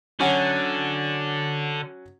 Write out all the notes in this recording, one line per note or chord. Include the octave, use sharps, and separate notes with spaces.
D3 F#3 C#4 F#4